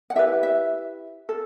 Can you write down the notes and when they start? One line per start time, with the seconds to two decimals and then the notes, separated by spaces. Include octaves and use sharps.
0.10 F#5
0.15 E4 G4 B4 E5
0.43 E5
1.29 A4